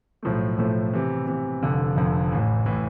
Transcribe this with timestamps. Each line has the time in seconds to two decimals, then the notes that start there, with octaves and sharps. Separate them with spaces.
0.23 B1 A2 F3 A3
0.58 B1 A2 F3 A3
0.93 C3 E3 B3
1.27 C3 E3 B3
1.63 F1 F2 D3
1.96 F1 F2 D3
2.32 A1 A2 E3
2.66 A2 E3